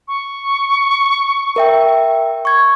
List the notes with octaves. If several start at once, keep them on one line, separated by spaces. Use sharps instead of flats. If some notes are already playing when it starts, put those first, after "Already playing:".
C#6
A#4 E5 G5
C#6 G#6